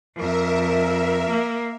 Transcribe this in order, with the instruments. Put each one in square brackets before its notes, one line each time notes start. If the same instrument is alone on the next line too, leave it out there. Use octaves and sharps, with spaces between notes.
[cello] F2 [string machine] A#4 E5
[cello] A#3